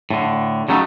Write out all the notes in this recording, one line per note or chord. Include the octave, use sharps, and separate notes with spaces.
A2 D3
C#3 F#3 G3 A3 D4 D#4